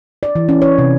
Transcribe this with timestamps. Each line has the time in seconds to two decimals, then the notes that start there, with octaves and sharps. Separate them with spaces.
0.23 D5
0.35 E3
0.49 C#4
0.62 C#5
0.78 C3